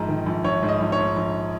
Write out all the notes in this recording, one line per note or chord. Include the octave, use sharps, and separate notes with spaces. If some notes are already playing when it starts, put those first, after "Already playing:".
Already playing: A#1 G#2 A#5
D#3
A#1
A#1 C#5
G#2
D#5
A#1
C#5
G#2
A#1